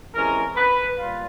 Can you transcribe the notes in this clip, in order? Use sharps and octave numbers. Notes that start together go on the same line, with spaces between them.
C3 E3 G#3 C#4 A#4
B4
A#2 G3 F4